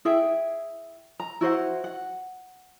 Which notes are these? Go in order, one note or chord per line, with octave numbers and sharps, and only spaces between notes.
E4 G#4 E5 G5
A#5
E4 F#4 C5 F#5
F#5